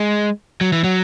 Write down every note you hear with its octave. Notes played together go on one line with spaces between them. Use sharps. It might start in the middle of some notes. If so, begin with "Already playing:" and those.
Already playing: G#3
F#3
E3
F#3